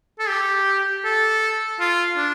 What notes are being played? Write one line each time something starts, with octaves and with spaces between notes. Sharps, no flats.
A4
G4
A4
F4
D4